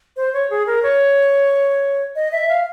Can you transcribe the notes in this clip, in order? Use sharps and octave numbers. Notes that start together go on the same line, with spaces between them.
C5
C#5
G#4
A#4
C#5
D#5
E5
F5